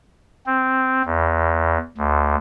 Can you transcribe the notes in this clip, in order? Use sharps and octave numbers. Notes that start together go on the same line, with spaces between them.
C4
E2
D2